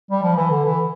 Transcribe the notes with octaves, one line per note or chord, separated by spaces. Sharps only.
G3
F3
E3
D3
E3